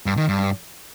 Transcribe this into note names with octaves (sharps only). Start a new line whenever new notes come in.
G2
D#3
G2